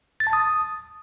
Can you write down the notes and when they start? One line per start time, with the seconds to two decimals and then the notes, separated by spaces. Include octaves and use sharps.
0.20 A6
0.27 A5
0.33 D#6